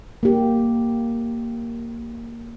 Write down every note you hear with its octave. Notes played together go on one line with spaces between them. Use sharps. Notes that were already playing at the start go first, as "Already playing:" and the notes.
A#3 G4